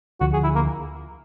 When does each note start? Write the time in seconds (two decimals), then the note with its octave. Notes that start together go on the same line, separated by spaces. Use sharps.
0.20 D2 D3 F3 F#4
0.33 G#4
0.43 E4
0.55 A#3